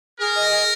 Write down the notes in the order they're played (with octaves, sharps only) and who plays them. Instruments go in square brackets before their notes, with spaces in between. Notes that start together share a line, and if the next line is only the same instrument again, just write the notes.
[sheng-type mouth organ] G#4 [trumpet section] A#4
[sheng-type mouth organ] D#5
G#4